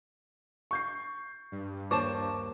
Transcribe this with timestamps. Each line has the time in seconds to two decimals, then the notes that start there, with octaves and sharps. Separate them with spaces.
0.71 C#6 G6 C7
1.52 G2
1.91 D#2 C5 C#5 A5 C#6 D6